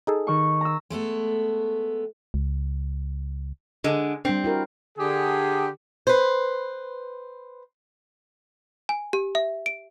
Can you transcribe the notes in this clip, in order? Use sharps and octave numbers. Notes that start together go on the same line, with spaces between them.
D#4 G#4 A4
D#3 C#6
A#5 E6
G#3 A3 B3 A4
C#2
D3 G#3
G3 C4 D4
E4 F#4 A#4
D3 G4 G#4
B4 C5
G#5
G4
E5
D7